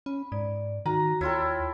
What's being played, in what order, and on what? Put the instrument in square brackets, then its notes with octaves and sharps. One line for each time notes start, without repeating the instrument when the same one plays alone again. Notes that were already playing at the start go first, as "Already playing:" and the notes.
[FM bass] C#4 [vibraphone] B5
[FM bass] G#2 [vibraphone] D5
[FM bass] D#3 [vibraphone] F#4 [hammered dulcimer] A#5
[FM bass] D#2 [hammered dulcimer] E4 F4 A4 [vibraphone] C#5 G5